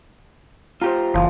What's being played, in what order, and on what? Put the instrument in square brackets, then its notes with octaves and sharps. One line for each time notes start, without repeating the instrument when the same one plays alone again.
[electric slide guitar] F4 G4 C5 [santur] A#5
[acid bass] F#1 [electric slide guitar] E3 [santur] F3